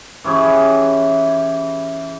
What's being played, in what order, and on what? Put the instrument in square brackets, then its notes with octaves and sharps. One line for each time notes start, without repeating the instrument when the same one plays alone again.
[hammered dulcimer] E3 C#4 G4 G#4